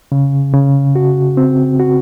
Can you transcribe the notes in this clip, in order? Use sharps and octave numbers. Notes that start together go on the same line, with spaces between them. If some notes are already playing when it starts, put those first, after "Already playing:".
C#3
C#3
F#4
C4
F#4